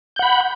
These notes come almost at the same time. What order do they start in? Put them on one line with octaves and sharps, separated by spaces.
G6 F#5 B5